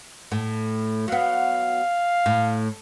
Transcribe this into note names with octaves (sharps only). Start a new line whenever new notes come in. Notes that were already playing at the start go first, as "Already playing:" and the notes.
A2
F#3 B3 F5
A2